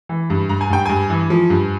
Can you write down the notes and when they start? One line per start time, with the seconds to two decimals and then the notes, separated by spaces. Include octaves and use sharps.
0.09 E3
0.30 G2
0.49 G2 A#5
0.61 G#5
0.70 G2 G5
0.86 G2 G#5
1.10 E3
1.30 F3
1.50 G2